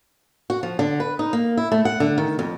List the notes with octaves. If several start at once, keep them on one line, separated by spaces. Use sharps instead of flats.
F#4
F3
D3
B4
D#4
A#3
E4
A3
F#5
D3
D#3
F2